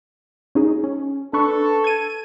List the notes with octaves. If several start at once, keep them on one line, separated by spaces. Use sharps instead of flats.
C#4 D#4 G#4
C#4
D4 A4 B4 C#6
G#6 D#7